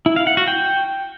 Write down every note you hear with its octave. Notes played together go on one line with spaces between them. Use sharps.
E4
F5
F#5
F#4
G5